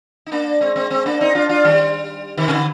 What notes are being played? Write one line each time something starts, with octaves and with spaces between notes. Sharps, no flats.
D#4
A#3 D4
G#3 C4
G#3 C4
G#3 C4
A#3 D4
C4 D#4
D4 F4
D4 F4
D#3 G3
C3 D#3
C3
D3